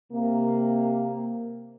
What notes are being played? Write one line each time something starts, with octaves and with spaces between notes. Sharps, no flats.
C3 A#3